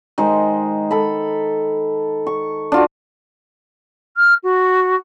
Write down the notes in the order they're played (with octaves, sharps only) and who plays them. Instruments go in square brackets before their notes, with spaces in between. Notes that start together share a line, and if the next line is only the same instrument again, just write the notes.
[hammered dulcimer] D#3 G#3 C5
A4 B5
C#6
D4 F4 F#4
[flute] F6
F#4